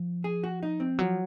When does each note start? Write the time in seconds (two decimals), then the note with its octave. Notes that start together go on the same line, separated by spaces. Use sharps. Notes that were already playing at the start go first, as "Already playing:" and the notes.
Already playing: F3
0.24 G#4
0.43 F#4
0.63 D#4
0.80 C4
0.99 F3 F#3